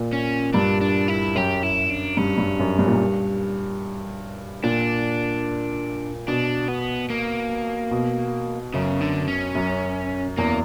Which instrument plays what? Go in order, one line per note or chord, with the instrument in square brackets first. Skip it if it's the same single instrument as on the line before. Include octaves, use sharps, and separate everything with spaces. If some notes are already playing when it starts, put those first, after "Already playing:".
Already playing: [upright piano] A#2
[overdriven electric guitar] C#4
[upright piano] G2 [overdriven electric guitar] D4
[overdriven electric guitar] D4
E4
[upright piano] F#2 [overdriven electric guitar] G4
[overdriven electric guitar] E4
D4
[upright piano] G2 [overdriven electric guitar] C#4
[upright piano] G2
F#2
G2
A#2
G2
[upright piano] A#2 [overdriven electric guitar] D4
[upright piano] B2 [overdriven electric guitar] D4
[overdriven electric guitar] B3
A#3
[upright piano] B2
[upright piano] F#2 [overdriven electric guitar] C#3
[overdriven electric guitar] D3
C#4
[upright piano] F#2
[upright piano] E2 [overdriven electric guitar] A#3